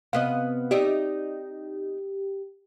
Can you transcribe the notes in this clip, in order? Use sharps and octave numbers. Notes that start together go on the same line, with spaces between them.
C3 B3 D#5 F5
D#4 G4 D5 E5